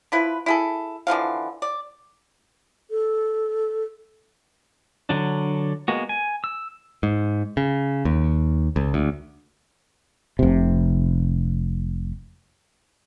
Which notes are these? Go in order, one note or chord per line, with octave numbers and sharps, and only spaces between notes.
F3 E4 B4
E4 G#4 A4
D3 E3 F3 F5
D5
A4
D3 F#3 D4
G#3 A#3 B3 F#4
G#5
E6
G#2
C#3
D#2
C#2
D2
F1 C3